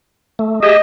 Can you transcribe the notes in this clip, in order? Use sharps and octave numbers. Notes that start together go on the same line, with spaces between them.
A3
G4 G#4 D#5 E5